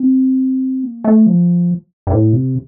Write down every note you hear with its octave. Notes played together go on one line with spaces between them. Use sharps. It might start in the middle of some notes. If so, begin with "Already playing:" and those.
Already playing: C4
A#3
A3
F3
G2
A2
C3